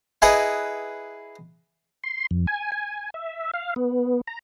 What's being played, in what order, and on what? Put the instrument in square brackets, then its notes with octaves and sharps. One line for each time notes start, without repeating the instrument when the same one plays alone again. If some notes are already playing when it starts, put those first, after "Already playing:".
[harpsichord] E4 G#4 B4 D#5 F#5 A#5
[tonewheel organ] C6
F2
G#5
G#5
E5
F5
B3
A#5